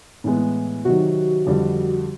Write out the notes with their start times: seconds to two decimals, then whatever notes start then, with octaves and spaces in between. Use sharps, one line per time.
0.24 A2 E3 G#3 B3
0.85 C3 D#3 F#3 F#4
1.46 F2 D3 G3